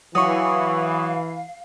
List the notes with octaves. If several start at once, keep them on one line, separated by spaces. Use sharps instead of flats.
E3 F#3 F5 C#6 D#6